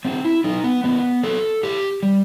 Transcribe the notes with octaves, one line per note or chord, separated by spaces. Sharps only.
A2 C4
E4
F#3 D#4
B3
A2 B3
F#3 A4
A2 G4
G3